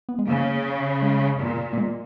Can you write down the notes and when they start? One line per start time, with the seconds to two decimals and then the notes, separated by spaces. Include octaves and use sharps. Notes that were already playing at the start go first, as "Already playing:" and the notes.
0.09 B3
0.19 G#3
0.27 C#3 A#3
1.02 G#3
1.40 A#2
1.73 A#3
1.78 G#3